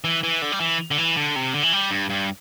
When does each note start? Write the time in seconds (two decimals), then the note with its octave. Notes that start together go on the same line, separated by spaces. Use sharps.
0.04 E3
0.23 E3
0.42 D3
0.52 G3
0.60 E3
0.91 D3
0.98 E3
1.16 D3
1.36 C3
1.54 D3
1.63 E3
1.73 G3
1.91 G2
2.10 G2